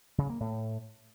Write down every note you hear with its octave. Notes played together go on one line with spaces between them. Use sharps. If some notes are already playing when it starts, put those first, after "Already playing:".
C#3
A#3
A2